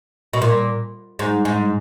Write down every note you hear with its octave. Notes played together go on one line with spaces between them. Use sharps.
B2
A#2
G#2
G#2